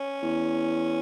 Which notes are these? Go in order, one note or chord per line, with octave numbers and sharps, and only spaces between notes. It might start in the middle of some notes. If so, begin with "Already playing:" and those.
Already playing: C#4
E2